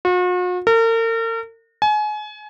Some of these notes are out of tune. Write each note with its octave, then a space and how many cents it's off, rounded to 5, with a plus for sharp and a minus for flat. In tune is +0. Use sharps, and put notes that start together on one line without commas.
F#4 -45
A#4 -40
G#5 +30